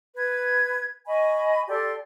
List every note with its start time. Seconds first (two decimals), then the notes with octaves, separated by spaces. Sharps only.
0.16 B4 G#6
1.06 D#5 G#5 B5 C#6
1.67 G4 A4 D5 C6